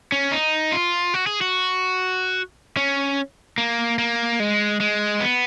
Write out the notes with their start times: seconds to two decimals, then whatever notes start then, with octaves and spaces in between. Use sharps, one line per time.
0.12 C#4
0.32 D#4
0.72 F4
1.14 F#4
1.27 G#4
1.41 F#4
2.77 C#4
3.58 A#3
3.99 A#3
4.40 G#3
4.80 G#3
5.20 B3